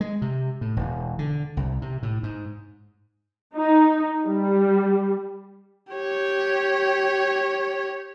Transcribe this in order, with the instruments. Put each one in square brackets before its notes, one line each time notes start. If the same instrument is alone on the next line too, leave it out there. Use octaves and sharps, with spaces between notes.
[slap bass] G#3
C3
A2
E1
D3
C2
C3
A2
G#2
[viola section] D#4
G3
[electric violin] G4 C#5